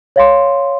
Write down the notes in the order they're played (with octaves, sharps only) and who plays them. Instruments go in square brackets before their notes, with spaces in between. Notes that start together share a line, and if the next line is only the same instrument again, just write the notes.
[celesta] C#5 F5 C6